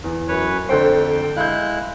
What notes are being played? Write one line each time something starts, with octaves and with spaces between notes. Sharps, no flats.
E2
F#2 B4 C#5
F2 D3 A4 C5 G5
G#3 E4 F5 F#6 G6